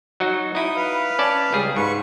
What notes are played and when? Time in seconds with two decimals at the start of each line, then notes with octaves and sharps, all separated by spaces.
0.20 F#3 D#4 F#4
0.55 D#4 E4 D#6
0.76 B4 F5
1.19 C#4 D5 A5
1.53 C#2 G3 G#4
1.76 G#2 B4 C#6